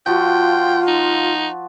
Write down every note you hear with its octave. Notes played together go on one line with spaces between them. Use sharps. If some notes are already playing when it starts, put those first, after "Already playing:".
F3 F4 F#4 G5
D#4